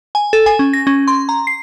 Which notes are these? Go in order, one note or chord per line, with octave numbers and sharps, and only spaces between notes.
G#5
A4
G#5
C#4
A#6
C#4
C6
A#5
C7